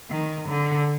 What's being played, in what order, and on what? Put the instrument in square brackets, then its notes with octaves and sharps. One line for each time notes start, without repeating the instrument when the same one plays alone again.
[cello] D#3
D3